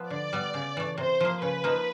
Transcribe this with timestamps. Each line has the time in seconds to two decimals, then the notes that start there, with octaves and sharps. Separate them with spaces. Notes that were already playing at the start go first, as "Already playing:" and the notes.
Already playing: F3 B3
0.10 D3 D5
0.33 G3 B3
0.54 C#3
0.77 E3 A3
0.98 C3 C5
1.21 F3 A#3
1.42 C#3 B4
1.64 F3 A#3 D#4